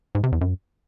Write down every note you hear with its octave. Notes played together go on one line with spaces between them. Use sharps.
G#2
C3
E2
F#2